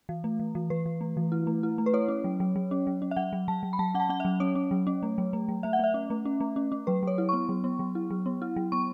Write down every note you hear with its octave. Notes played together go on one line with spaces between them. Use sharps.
E3
A3
E3
E3
E3 B4
E3
A3
E3
E4
A3
E4
A3
B4
E4 C#5
C#4
F#3
F#3
F#3
C#4
F#3
C#4
E5
F#3 F#5
F#3
F#3 A5
F#3
B5
F#3 A5
C#4 F#5
A5
C#4 F#5
F#3 E5
C#4 C#5
C#4
F#3
C#4
A3
F#3
A3
F#3
A3 E5
F#5
A3 E5
C#4
A3
C#4
A3
C#4
C#4
F#3 B4
F#3 C#5
E4
B3 C#6
F#3
B3
F#3
E4
F#3
B3
E4
F#3
B3 C#6